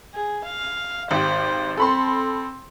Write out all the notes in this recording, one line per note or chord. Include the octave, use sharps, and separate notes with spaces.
G#4
F5
G#1 G4 C5
C4 A4 B5 C6